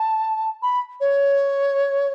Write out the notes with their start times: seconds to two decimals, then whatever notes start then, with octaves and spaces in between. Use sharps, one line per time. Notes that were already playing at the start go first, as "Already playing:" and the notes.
Already playing: A5
0.62 B5
1.00 C#5